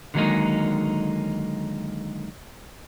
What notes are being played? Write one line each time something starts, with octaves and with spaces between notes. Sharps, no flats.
D3 D#3 F#3 G#3 A#3 D#4